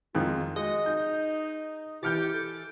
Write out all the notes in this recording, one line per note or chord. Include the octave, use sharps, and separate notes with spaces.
F2 D#3 G#3 F4
G#3 F#4 D#5
D#4 G6
E3 G4 F6 G6 A6 C#7 D7
A4